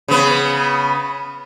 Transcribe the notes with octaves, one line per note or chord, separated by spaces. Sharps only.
C#3 B3